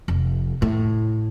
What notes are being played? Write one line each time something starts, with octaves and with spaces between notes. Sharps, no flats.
F1
A2